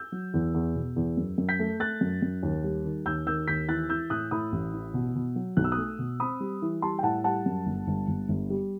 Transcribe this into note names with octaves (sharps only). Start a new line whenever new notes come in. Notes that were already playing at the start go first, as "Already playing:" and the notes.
Already playing: E6 G6
F#3
E2
E2
B2
E2
F#2
F#2
G6 B6
A3
A3 F#6 A6
F#2
F#2
D#2
G3
D#3
D#2 E6 G6
D#3 E6 G6
D#2 G6 B6
E3 F#6 A6
E3 E6 G6
A2 D#6 F#6
A2 B5 D#6
A1
E3
B2
B2
F#3
B1 F#6
E6
D#6 F#6
A3
B2
C4 B5 D#6
G3
E3
G3 A5 C6
G5
A2 F#5 A5
G3 F#5 A5
F#2
G1
G1
G1
G1
G3